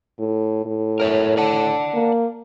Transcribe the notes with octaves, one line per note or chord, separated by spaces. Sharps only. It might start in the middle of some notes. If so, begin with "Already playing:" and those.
A2
A2
A#4 C#5 E5
D5 F#5 A5
A#3